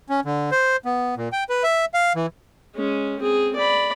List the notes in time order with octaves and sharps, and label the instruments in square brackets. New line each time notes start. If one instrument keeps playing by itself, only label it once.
[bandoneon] C#4
D3
C5
B3
A#2
G5
B4
E5
F5
E3
[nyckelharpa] G#3 C#4
C4 G#4
D5 B5